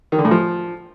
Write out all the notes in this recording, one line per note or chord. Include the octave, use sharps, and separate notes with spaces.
D#3
D3
A2
F3